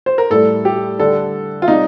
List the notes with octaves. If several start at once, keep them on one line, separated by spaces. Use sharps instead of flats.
C5
A#4
A2 G3 A4
G4
D3 G3 A4
F4
C3 G3 D#4